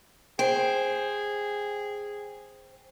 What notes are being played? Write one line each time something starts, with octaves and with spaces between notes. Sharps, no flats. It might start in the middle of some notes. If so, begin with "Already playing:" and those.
G#4 C5 G5